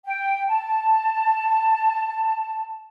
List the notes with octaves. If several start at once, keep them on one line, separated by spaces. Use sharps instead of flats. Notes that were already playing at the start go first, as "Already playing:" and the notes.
G5
A5